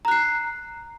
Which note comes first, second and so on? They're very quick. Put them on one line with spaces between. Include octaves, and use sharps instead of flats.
A#5 F#6 C7